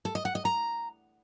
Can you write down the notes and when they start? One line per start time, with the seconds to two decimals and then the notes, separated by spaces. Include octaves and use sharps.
0.05 A4
0.15 D#5
0.25 F#5
0.35 D#5
0.45 A#5